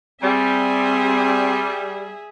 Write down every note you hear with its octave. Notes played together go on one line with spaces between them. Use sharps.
G3 C4 G#4 E5